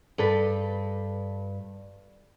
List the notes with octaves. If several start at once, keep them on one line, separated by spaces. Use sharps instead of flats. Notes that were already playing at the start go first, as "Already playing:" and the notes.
G2 A4 B4